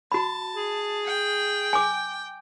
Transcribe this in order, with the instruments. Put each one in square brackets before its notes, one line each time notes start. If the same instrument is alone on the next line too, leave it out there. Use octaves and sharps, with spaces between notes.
[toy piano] F#4 B5 [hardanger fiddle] A5
[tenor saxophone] G#4
[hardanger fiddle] G5
[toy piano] G#5 D6